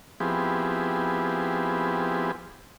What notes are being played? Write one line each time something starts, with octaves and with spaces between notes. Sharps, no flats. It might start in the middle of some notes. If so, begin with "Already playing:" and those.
F3 B3 C4 E4 G4 G#4